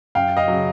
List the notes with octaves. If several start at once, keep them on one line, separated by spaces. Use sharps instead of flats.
F#2 F5 G5
D#5 F5
C#3 F#3